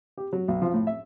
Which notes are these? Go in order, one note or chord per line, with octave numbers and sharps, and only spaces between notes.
G4
F#3
B1
F3
A2
E5